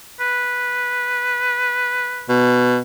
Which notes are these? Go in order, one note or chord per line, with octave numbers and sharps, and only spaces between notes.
B4
B2